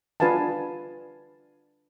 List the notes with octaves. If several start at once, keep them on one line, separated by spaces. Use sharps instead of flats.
D4 F4 B4 F5 G#5 A5